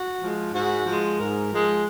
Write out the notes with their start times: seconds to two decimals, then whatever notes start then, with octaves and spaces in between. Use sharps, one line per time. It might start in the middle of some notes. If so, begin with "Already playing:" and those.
Already playing: F#4
0.21 F3 G#3
0.53 G#2 F#4
0.85 F3 G#3
1.18 G#2 A#4
1.51 F3 G#3